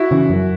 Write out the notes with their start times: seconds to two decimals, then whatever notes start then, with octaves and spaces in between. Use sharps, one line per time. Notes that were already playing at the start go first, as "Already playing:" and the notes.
Already playing: E4 F#4
0.11 C#3 E3
0.30 F#2